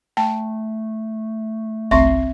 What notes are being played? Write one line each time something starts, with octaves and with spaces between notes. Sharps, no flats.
A3 G5 A5
G1 C2 C4 E5 C6 C#6 C7